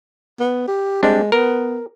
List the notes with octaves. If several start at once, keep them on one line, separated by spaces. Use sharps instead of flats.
B3
G4
G3 G#3 C4 D4
B3 A#4